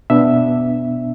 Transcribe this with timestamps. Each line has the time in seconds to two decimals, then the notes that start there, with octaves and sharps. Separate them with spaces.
0.10 B2 B3 D4 E5